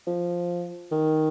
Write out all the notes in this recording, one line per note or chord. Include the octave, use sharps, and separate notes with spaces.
F3
D#3